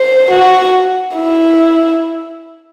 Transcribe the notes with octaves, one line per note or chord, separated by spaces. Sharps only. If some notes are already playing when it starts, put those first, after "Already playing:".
Already playing: C5
F#4
E4